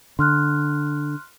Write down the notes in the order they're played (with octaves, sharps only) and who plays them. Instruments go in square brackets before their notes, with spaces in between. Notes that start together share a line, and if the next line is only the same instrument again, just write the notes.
[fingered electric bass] D3 [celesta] C6 F6 F#6